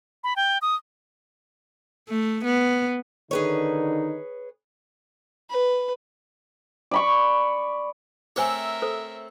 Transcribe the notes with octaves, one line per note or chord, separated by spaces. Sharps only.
B5
G5
D#6
A3
B3
D3 D#3 D#4 G#4 B4 C#5
B4
D5 B5 C#6
A3 C4 G#4 A#4 C5 C#5 E5 G#5
A4 C5